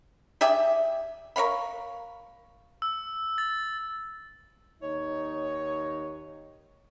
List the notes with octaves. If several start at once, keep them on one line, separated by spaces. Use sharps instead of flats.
G4 G#4 D5 E5
A#4 C#5 F5 B5
E6
A6
D#2 D#4 C#5